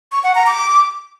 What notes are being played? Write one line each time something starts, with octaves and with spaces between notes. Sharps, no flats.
C#6
F#5
A#5
D6